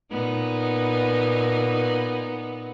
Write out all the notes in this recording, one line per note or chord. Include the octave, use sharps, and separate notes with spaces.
A#2 B3 D#4